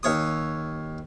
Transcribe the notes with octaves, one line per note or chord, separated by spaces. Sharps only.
D#2 C#5 D#6